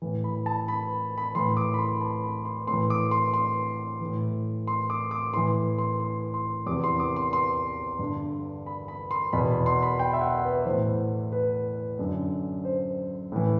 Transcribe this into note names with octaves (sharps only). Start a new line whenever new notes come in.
A2 E3
B5
A5
B5
B5
A2 E3 C6
D6
B5
C6
A5
B5
C6
A2 E3 C6
D6
C6
C6
A2 E3
C6
D6
D6
A2 E3 C6
C6
C6
C6
E2 C3 E3 D6
C6
D6
C6
C6
G2 D3
B5
B5
C6
E2 B2 B5
C6
B5
G5
E5
F#5
B4
A2 E3 C5
B4
F#2 D3
C5
A2 E3